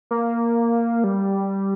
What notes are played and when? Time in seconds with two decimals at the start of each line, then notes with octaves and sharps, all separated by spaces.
0.11 A#3
1.04 G3